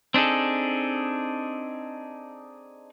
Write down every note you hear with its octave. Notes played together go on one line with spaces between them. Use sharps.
C4 D4 D#4 G#4 A4